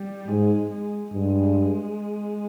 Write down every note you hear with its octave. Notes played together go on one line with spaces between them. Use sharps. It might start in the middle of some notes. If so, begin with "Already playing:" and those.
Already playing: G3
G#2 G#3
G#3
G2 G#3